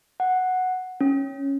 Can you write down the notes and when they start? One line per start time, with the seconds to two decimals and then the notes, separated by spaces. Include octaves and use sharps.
0.20 F#5
1.01 C#4